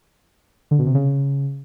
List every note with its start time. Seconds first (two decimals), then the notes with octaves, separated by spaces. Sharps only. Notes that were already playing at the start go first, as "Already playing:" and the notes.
0.71 D3
0.79 B2
0.87 C3
0.94 C#3